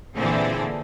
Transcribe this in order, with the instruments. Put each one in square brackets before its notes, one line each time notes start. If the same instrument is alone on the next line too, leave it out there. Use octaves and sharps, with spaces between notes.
[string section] A#2 D3 E3 C4 G#4 A4